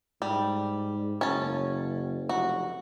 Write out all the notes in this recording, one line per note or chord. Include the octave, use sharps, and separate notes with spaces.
G#2 G3
F#1 C#4 A5
F1 F#4